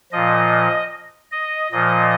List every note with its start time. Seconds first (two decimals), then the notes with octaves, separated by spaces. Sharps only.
0.12 A#2 F3 D#5
1.32 D#5
1.71 A#2 F3 D#5